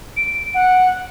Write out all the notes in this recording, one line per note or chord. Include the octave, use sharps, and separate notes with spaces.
D7
F#5